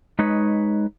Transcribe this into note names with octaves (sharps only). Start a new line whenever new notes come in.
G#3 D#4 B4 C#5